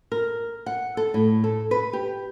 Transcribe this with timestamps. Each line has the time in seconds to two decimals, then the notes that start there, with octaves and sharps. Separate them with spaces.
0.12 A#4
0.66 F#5
0.97 A4
1.14 A2
1.44 A4
1.71 B4
1.93 G4